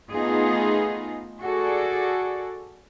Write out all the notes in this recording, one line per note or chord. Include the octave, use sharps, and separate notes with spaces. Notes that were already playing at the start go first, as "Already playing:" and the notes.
A3 B3 D#4 F4 G#4
F#4 G#4 A4 D5